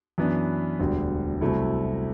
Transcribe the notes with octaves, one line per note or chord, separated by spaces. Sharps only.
F#2 E3 B3 D4
E1 D2 D3 G3
C2 C3 F#3 A3 E4